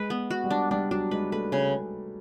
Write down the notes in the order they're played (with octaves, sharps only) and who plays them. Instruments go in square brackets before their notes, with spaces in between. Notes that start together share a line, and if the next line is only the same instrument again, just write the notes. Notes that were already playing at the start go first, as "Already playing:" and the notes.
Already playing: [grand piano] G#3 [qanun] B4
[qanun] B3
F#4
[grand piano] G3
[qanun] D4
[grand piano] G3 [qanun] D4
[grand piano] F#3 [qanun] D4
[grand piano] G#3 [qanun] B4
[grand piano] A3 [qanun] B4
[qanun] C#3